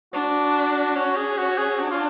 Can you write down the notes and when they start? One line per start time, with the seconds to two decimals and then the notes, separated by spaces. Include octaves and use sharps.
0.13 D4 F#4
0.95 C#4 F#4
1.16 G#4
1.38 F#4
1.58 G#4
1.79 D4 F#4
1.91 F4